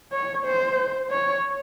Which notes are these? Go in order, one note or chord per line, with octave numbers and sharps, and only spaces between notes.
C#5
C5
C#5